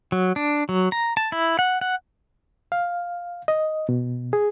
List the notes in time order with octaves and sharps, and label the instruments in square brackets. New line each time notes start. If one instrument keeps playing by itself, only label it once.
[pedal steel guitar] F#3
D4
F#3
A#5
A5
E4
F#5
F#5
[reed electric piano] F5
D#5
B2
G#4